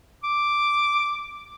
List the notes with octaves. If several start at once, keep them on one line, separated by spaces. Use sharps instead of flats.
D6